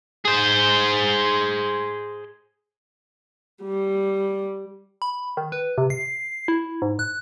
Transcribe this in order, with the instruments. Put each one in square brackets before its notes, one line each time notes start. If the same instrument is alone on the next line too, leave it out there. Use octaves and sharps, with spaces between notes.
[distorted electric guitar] G#4 C5
[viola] G3
[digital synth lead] B5
D#3
B4
C3
C7
E4
G#2
F#6